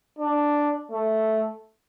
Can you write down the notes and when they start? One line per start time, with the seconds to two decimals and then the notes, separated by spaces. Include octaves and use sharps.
0.19 D4
0.91 A3